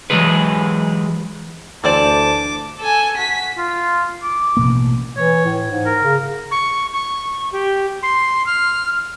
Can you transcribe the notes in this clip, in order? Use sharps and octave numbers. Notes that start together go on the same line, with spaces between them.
E3 F#3 G#3 G#4 B4
D2 E3 C5 D5 A5 D6
A4 G#5
F#4 B6
F4
D6
A1 B2 A#3
E3 C#5
A2
G#2
A#4
C#3
C#6
C#6
G4
C6
F6